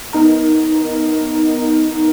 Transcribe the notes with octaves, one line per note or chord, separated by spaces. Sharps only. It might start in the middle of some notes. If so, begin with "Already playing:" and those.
B3 D#4 A#4